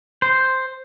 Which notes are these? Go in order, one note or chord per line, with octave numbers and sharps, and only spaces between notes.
C5